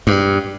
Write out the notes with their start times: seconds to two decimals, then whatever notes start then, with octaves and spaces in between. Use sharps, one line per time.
0.07 G2